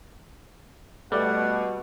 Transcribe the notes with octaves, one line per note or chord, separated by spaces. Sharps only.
B2 G3 A3 D5 F#5